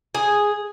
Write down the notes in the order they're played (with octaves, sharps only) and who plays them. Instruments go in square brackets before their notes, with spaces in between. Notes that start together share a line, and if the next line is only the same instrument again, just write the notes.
[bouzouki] G#4